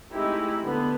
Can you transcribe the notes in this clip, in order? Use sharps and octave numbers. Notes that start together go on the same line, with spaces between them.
G#3 A3 C4 D#4 E4 G4
D3 B3